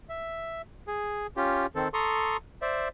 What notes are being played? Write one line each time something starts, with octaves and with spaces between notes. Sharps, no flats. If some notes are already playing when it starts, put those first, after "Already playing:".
E5
G#4
C#4 F4 G4
D#3 C4 A4
A4 A#5 C6 C#6 D#6
C5 D5 E5